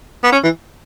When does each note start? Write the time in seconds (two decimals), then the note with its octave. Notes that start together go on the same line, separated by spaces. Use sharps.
0.24 B3
0.32 C#4
0.44 E3